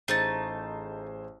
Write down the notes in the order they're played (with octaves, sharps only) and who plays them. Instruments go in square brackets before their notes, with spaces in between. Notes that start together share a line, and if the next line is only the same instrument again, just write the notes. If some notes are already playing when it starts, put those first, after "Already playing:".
[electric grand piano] A1 G#4 C5 [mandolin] A3 D#4 A5